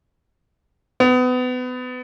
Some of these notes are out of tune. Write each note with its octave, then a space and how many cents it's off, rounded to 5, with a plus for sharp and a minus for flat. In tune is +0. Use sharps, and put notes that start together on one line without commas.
B3 +30